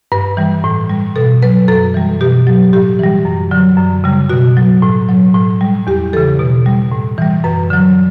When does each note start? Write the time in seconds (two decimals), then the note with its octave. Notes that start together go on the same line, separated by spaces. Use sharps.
0.12 G2 B4
0.37 E3 G3
0.64 A2
0.89 G3
1.16 B2 A4
1.42 F#3 B4
1.68 F#2 A4
1.94 E3 G3
2.21 B2 G4
2.47 F#3
2.73 A2 G4
2.99 E3 G3
3.25 F#2
3.51 D3 F#3
3.77 F#2
4.04 C#3 G3
4.30 B2 F#4
4.57 F#3
4.82 A2
5.09 F#3
5.35 A2
5.61 G3
5.87 E2 G4
6.13 C#3 E3 A4
6.39 B2
6.66 G3
6.92 A2
7.18 E3 G3
7.44 F#2 B4
7.70 D3 F#3